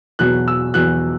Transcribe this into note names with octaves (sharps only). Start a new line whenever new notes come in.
E2 B2 F#3 F#6
E6
E2 B2 F#3 F#6